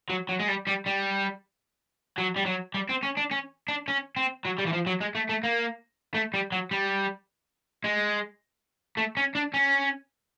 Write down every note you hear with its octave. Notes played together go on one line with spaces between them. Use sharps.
F#3
F#3
G#3
G3
G3
G3
F#3
G3
F#3
G3
C4
C#4
D4
C#4
D4
C#4
C4
F#3
G3
E3
F3
F#3
G#3
A3
A3
A#3
A3
G3
F#3
G3
G#3
A3
C#4
D4
C#4